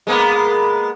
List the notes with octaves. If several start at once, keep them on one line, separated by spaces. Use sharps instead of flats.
G#3 A#3 B3